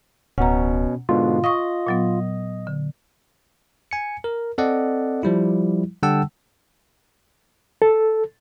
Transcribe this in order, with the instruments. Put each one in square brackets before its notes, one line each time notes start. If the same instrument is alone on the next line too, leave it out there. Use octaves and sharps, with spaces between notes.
[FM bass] D1 [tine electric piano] B2 C#4 [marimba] F#5 A#5
[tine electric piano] G#2 B2 D3 [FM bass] F4
[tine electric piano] D#5 [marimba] F5 C#6 D#6
[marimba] A#2 F#3 B3
D3
[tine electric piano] G#5 C#7
A#4
C4 A4 D5 D#5 F#5
F3 G3 E4
D3 G3 F#5 G5 A5 E6
[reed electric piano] A4